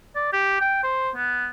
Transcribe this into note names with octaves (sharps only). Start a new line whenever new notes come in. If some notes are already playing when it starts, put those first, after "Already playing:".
D5
G4
G5
C5
B3